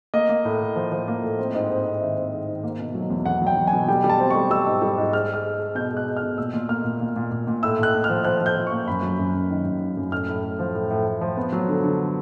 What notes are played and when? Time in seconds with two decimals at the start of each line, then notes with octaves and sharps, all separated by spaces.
0.14 A#3 D#5
0.29 A#3
0.45 A2
0.61 A2
0.76 F3
0.92 F3
1.08 A#3
1.23 A2
1.39 C4
1.55 G#2
1.70 C4
1.86 C4
2.01 D#3 E5
2.17 C4
2.33 G#2
2.48 D#3
2.64 A#3
2.79 B2
2.95 F#3
3.10 E2
3.25 E2 F#5
3.42 F#3
3.47 G5
3.57 F#3
3.67 G#5
3.73 B2
3.88 G3 G5
4.04 G3
4.09 A5
4.20 C4
4.30 G3 C#6
4.50 G3 E6
4.66 G#2
4.82 G3
4.98 G#2
5.13 G#3 F6
5.29 G#3 F6
5.44 G#3
5.60 G#3
5.75 B2 G6
5.91 G#3
5.97 F#6
6.07 G#3
6.17 F6
6.23 B2
6.38 A#2 E6
6.54 A#2
6.69 A#3 F6
6.84 A#2
7.00 A#2
7.16 A#2
7.31 A#2
7.47 A#2
7.63 A2 E6
7.79 A2 F#6
7.94 A2
8.04 F6
8.10 F3
8.25 F3 F#6
8.41 F3
8.46 G6
8.56 F3
8.67 C#6
8.72 A#3
8.88 F#2 B5
9.03 F#3
9.19 F#2
9.34 F#2
9.50 D#3
9.65 F#2
9.81 D#3
9.97 F#2
10.12 A2 F6
10.28 A2
10.43 A2
10.59 F3
10.74 A2
10.91 A2
11.06 A2
11.21 F3
11.37 B3
11.53 F#3
11.68 D3
11.84 D3